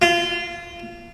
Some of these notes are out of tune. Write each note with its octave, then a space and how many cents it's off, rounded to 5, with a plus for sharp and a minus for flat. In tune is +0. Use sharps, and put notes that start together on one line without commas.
F4 -25